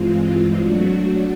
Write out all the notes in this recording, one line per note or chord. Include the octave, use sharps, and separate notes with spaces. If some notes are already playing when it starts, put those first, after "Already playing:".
Already playing: G2 E3 G#3 C4 F4
F#3 A3 D4 F#4